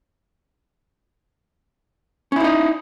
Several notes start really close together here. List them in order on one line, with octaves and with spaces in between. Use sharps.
C#4 E4 D#4 D#5